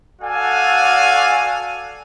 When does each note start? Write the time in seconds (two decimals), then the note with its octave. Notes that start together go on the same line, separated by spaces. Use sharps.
0.22 F#4 A4 D5 F5 F#5 G#5